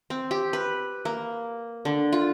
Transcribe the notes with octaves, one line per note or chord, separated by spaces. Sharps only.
C4
G4
B4
A#3
D3
F4